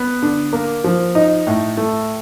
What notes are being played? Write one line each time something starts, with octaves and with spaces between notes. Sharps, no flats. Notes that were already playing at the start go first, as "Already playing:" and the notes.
Already playing: B3
D3
A#3
F3
D#4
A2
A3